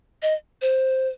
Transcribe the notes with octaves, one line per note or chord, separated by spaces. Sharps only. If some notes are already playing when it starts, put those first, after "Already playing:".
D#5
C5